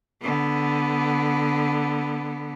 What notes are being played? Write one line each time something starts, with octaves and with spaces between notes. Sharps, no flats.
D3 B3